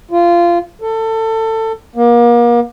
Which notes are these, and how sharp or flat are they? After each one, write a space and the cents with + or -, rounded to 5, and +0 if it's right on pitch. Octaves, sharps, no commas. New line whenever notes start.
F4 -20
A4 +25
A#3 +35